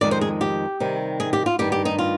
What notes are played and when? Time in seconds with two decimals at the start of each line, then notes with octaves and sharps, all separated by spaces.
0.01 F2 D#3 G#3 D5
0.11 C5
0.21 G#4
0.41 G4
0.80 C3 D#3 G3
1.20 G#4
1.33 G4
1.46 F4
1.59 G2 D#3 G3 G4
1.72 G4
1.85 D#4
1.99 F4